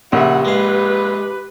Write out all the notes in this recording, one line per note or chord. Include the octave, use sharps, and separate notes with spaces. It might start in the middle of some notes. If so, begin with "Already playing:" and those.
A#1 C#3 G4 E5 F#5
G#3 B4 F5